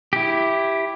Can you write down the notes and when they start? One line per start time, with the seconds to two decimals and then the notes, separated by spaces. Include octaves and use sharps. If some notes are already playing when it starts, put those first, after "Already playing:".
0.13 E4 G4